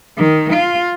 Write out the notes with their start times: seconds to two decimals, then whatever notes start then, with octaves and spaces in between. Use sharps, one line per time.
0.17 D#3
0.53 F4